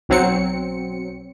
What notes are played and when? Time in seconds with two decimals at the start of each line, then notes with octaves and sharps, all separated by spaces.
0.09 B1 F#3 C4 C#7